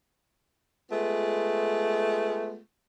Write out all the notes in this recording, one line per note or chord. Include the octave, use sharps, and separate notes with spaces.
G#3 A3 B3 F4